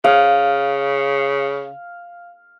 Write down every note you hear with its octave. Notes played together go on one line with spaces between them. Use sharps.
C#3 F5